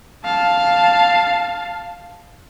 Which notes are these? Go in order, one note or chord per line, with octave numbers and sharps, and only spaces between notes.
F5 A5